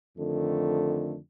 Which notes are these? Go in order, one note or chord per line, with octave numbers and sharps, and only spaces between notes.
F2 D3 D#3 A3